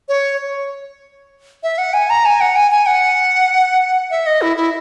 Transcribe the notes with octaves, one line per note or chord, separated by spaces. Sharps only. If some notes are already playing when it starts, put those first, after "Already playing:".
C#5
E5
F#5
G#5
A#5
G#5
F#5
G#5
G#5
F#5
E5
D#5
E4
E4